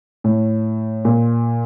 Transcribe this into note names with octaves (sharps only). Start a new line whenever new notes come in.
A2
A#2